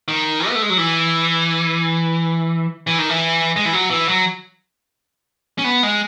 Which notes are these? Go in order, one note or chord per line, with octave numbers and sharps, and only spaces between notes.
D#3
B3
A3
G#3
F#3
E3
E3
D#3
E3
G#3
E3
F#3
E3
F#3
C#4
B3
G#3